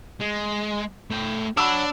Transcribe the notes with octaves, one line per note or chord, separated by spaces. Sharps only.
G#3
A3 G5
D4 C#5 F#5 B5 E6